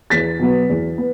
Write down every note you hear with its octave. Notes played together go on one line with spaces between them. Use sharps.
E2 A6 B6
B2 F#3 B3
E2
B3